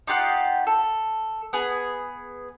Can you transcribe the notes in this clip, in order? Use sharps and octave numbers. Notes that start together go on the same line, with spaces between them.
D#4 F4 G4 F#5
A4
B3 G#4